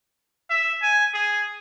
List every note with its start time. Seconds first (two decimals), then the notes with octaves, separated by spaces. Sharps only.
0.50 E5
0.82 G#5
1.14 G#4